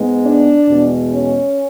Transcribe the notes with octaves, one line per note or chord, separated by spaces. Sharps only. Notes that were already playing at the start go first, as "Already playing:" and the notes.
Already playing: G#2 G#3 B3
D4
E2 B2 G#3
C#4